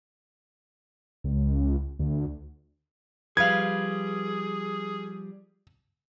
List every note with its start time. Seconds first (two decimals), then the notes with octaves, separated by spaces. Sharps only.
1.24 C#2
1.99 D2
3.37 F3 G3 G#4 B4 F5 G#6